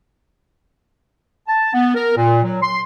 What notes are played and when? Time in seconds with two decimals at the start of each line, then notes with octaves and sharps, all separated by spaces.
1.48 A5
1.73 B3
1.95 A#4
2.16 A#2
2.43 F#3
2.62 C6